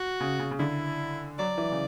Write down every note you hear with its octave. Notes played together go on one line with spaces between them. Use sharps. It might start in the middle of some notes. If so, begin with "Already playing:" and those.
Already playing: F#4
C#3
C#3
C#3
D3 E4
F#3 D5
E3
C#3